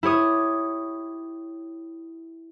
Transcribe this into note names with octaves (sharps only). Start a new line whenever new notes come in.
E4 G4 C#5 D#6